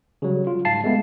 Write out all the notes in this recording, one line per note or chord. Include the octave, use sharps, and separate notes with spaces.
C#3 F#3 G3
F4
G#2 F5 A5 C7
G#3 A3 B3